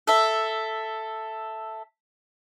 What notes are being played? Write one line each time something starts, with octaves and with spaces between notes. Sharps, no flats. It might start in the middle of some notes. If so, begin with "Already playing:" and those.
A4 E5